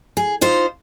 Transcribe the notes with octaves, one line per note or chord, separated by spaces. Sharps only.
G#4
D#4 F4 C5